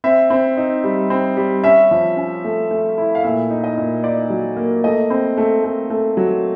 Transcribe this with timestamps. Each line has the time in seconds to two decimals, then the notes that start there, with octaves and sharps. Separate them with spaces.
0.04 C4 E5
0.30 C4
0.57 D#4
0.84 G3
1.10 C4
1.37 G3
1.64 C#4 E5
1.91 F3
2.17 C#4
2.44 A3
2.71 A3
2.98 E4
3.15 F5
3.23 A#2 E5
3.50 D#4
3.64 D#5
3.77 A#2
4.04 D#4 D5
4.30 F#3
4.57 A#3
4.84 A3 D#5
5.10 C4
5.37 A3
5.64 A3
5.90 A3
6.17 F#3